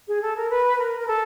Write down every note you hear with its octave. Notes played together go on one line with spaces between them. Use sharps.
G#4
A4
A#4
B4
A#4
A#4
A4